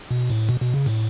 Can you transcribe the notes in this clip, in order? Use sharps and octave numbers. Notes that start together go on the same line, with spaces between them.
B2
A2
B2
B2
C#3
A2